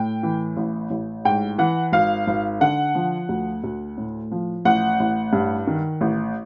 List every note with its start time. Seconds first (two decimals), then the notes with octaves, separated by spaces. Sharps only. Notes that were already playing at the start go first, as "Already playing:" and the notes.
Already playing: A2 G5
0.23 E3
0.56 A1
0.90 A1
1.25 G#2 G5
1.58 E3 F#5
1.93 G#1 F5
2.28 G#1
2.61 D3 F#5
2.95 F3
3.29 D2
3.64 D2
3.98 A2
4.32 F3
4.65 A1 F#5
5.00 A1
5.33 G2
5.67 D#3
6.01 A1